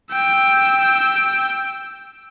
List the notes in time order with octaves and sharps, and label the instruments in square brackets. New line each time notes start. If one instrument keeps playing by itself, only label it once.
[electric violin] G5 E6